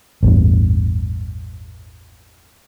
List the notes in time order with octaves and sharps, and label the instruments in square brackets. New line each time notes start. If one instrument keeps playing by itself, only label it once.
[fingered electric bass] A1 E2 G2